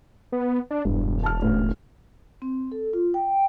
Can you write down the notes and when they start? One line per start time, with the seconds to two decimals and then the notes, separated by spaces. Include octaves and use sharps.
0.32 B3
0.71 D4
0.85 E1 G2
1.24 A5 F6
1.42 A1 D2
2.42 C4
2.72 A4
2.93 F4
3.14 G5